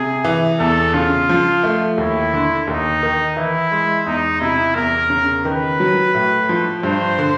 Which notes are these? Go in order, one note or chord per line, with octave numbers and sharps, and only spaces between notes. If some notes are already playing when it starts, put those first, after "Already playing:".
Already playing: C3 G#4
E3
E2 A4
C#3 F4
F3
A3
D#2 E4
D3
D#2 D#4
D#3
E3 E4
G#3
E2 D#4
C3 E4
E2 A#4
C#3
D#3 B4
F#3
A2
F3
G2 C5
D3